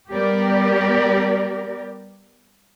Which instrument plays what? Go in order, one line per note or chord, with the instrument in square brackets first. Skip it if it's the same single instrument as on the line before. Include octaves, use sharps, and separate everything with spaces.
[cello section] G3 B3 G4 A#4 D5